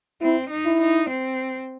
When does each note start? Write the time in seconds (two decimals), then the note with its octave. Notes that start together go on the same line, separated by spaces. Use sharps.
0.21 C4 E4
0.50 D#4
0.66 E4
0.80 D#4
1.09 C4